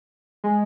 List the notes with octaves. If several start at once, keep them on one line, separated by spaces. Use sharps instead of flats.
G#3